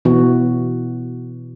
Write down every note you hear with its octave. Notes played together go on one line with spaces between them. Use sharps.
B2 E3 B3 F#4